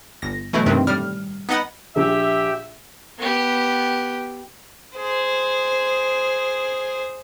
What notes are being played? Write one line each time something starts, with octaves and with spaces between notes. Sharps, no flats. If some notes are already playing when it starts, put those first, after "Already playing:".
G1 A#6
B2 E3 F#3 A3 E4
G2 C3 D#3 E3 C4
A2 G3 F6
B3 D#4 D#5 F#5 B5
A#1 G4 E5
B3 G4
G#4 C5